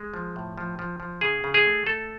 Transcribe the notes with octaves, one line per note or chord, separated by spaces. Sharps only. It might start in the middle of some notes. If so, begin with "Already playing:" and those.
Already playing: G#3
F3
A2
F3
F3
F3
C#3 G#4
C#3
G#4
A3
A3 A4